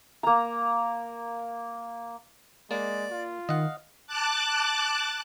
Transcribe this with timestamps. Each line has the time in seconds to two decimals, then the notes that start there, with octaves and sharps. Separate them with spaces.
0.23 A#3 A#5
2.71 G#3 A#3 D5
3.10 F4
3.49 D#3 D#5 F5 F#5
4.07 A5 D6 F#6